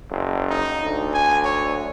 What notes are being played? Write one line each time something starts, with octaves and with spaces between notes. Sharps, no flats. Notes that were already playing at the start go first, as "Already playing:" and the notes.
F#1
D#4
D2
G#5
C#5